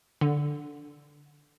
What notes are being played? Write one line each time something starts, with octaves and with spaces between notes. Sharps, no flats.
D3